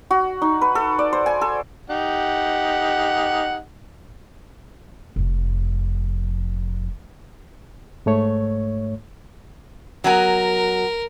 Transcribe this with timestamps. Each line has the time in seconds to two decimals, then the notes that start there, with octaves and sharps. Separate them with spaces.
0.11 F#4
0.42 D#4
0.61 B4
0.75 A4
0.99 D5
1.13 C5
1.26 G#5
1.41 A4
1.90 D#4 G4 F#5
5.16 F1 F2
8.06 G#2 A3 C#5
10.04 F#3 B3 A#4 G#5